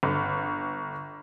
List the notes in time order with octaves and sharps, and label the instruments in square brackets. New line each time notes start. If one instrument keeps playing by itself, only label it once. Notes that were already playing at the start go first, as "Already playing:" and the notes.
[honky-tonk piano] G1